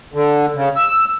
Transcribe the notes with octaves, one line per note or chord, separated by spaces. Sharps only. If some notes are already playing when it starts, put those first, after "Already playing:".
D3
C#3
E6